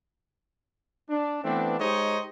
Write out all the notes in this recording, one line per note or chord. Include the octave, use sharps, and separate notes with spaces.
D4
E3 A3 B3 C4 D4
G#3 D#4 G4 C5 C#5 D#5